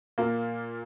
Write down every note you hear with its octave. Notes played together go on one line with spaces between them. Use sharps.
A#2 A#3